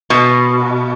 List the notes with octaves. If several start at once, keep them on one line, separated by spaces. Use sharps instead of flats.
B2